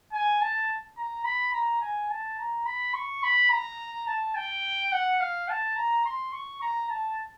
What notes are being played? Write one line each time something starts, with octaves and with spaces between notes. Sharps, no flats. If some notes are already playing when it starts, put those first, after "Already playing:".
G#5
A5
A#5
B5
A#5
G#5
A5
A#5
B5
C#6
B5
A#5
A5
G5
F#5
F5
A5
A#5
C6
C#6
A#5
A5